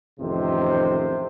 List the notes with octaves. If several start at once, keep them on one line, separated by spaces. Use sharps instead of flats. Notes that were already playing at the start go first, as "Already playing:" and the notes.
A1 F2 C3 D#3 C5